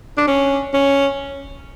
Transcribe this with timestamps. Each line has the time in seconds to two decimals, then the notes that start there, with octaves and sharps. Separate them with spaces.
0.17 D4
0.27 C#4
0.74 C#4